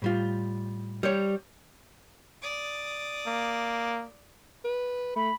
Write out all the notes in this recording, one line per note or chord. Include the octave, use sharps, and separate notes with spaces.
A2 G3 F4
G3 C5 C#5
D5 D#6
A#3
B4
A3 B5